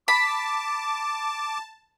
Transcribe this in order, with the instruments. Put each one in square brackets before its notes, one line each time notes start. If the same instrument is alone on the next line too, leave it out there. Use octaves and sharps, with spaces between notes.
[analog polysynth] A5 [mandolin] B5 [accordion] D6